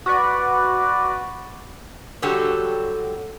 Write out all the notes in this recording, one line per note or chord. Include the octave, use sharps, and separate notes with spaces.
F#4 B4 D5
D3 F#3 G3 F#4 G4 A4